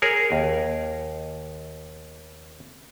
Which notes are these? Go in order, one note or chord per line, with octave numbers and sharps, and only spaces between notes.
G#4 A#4 C#5
D#2